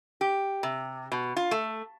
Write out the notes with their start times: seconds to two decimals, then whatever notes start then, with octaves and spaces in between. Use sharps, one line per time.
0.21 G4
0.63 C3
1.12 B2
1.36 F4
1.51 A3